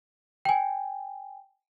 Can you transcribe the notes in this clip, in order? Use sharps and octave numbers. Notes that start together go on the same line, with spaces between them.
G5 G#5